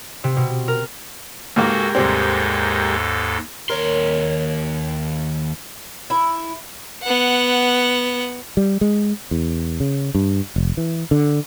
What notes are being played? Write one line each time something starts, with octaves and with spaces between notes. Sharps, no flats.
C3
B2
A#4
C#2 G#2 G#3 A#3 F#4 G4 A4 A#4
D#2 G#2 C3 G3 C4 A4
D#2 A#4 C#5 C6
E4
B3 F#5
G3
G#3
E2
C#3
G2
F1
E3
D3